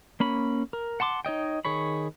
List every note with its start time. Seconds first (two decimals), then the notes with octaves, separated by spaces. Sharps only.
0.20 A#3 C#4 B5
0.73 A#4
1.00 F#5 A5 C6 D6
1.25 D#4 C#5 D#5 G5
1.65 D#3 G#4 C#5 B5